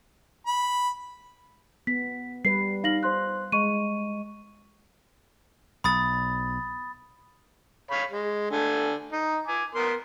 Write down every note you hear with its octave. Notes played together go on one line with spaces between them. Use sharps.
B5
B3 B6
G3 B4 C7
D#4 F5 A#6 F#7
C5 C6 F#6
G#3 D#5 C#6 D#7
B1 B5 D#6 A6
C#5 F5 B5
G#3
D3 A3 G#5
D#4
G#5 D6
B3 A#4 C6